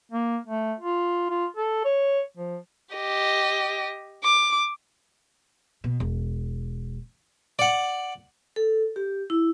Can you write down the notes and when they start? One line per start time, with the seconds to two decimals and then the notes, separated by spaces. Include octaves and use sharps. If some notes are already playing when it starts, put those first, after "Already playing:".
0.12 A#3
0.47 A3
0.80 F4
1.30 F4
1.57 A4
1.85 C#5
2.37 F3
2.95 G4 D#5
4.24 D6
5.84 B2
6.00 E1
7.59 D5 F#5
8.56 A4
8.96 G4
9.30 E4